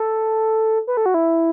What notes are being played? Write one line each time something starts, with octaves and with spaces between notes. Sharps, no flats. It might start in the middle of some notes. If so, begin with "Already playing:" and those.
Already playing: A4
B4
A4
F#4
E4